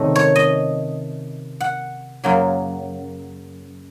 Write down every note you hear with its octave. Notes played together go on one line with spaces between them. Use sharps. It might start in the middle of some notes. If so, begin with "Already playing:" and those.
Already playing: C3 D#3 A3 C#4
C#5
D#5
F#5
F#2 C#3 F#3 A#3